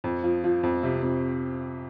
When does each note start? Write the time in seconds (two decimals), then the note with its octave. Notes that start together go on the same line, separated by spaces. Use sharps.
0.04 F2
0.23 F3
0.44 F3
0.63 F2
0.83 C3
1.03 F2